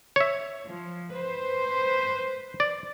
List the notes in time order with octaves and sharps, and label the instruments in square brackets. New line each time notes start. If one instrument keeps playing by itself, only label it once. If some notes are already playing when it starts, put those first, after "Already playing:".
[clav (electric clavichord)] C#5 E5
[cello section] F3
B4 C5
[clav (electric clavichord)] D5